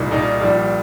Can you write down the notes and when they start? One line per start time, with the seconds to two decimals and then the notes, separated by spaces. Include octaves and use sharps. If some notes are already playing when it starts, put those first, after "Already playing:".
Already playing: C2 A#2 G3 D#4
0.11 C2 A#2 G3 D#4
0.40 A#1 A#2 G3